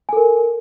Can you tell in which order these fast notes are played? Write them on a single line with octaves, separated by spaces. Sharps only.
G#5 A4 A#4